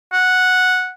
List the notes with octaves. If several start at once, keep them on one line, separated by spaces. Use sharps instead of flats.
F#5